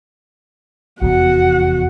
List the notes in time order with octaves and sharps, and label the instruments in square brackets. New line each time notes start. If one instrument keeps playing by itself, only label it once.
[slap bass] F1 E2 B3 [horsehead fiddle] F#4 F#5